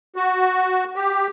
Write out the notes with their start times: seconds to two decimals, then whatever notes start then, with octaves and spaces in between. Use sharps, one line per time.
0.16 F#4
0.96 G4